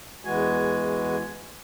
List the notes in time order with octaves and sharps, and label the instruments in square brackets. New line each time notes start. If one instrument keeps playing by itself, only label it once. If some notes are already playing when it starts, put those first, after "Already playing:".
[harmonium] E2 E3 G#3 F#4 G#5